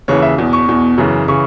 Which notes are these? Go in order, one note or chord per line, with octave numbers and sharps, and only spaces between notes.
D#2 C#3 E3 C#5
E5
E2 B2
C#6
E2 B2
F#2 C#3 E3
C#3 E3 C#6